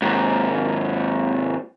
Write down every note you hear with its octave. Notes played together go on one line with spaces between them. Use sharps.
D#2 G#2